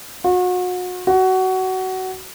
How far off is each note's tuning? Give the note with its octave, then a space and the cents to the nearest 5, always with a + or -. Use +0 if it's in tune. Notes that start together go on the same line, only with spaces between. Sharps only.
F#4 -35
F#4 +20